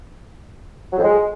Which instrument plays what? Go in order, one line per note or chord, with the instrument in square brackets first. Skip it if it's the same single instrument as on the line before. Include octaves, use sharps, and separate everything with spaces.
[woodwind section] F#3
F2
G#3